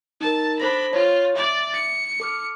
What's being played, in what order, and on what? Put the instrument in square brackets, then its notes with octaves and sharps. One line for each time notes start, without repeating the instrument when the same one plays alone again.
[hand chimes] D#4 A#4 [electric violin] A5
[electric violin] D4 B5 [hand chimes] A4 C5 A#6
[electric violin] F4 [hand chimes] C#5
[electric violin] D5 [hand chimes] E5
[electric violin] C#7
[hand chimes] A4 D6 F6